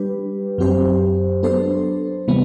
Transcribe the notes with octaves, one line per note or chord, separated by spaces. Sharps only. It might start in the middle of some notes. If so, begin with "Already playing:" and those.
Already playing: G3 D4 G4 B4
F#2 F#3 C4 G4 C5
F#3 B3 D4 A4 C5
C3 E3 G3 B3